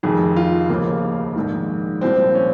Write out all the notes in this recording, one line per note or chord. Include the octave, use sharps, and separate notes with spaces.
F1 F2 D#3 G#4
F4
F1 D#2 C#3 F3 A#3
A#1 G#2 D#3
C2 A#2 F3 C4
C#4